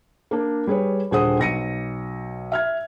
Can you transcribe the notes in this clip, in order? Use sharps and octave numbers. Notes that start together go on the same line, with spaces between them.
A#3 D4
G3 G#4 B4 C#5
D#1 D3 G#4 C5 F#5 D#6
B1 A#6 C#7 D#7
E5 F6 G#6